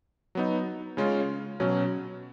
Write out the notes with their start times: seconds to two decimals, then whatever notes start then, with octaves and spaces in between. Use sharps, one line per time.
0.35 F#3 B3 D#4
0.97 C#3 G#3 C#4 F4
1.60 B2 F#3 C#4